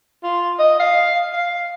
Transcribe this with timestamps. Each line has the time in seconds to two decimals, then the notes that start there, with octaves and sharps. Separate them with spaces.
0.23 F4
0.59 D#5
0.80 F5
1.33 F5